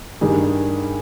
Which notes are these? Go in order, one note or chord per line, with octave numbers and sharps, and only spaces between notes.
G2 D#3 G3 G#4